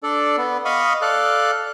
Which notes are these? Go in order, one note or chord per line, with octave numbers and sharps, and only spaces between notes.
D4 A4 D5
B3
D#5 F5 B5 C#6 D#6
A4 D5 F5 F#6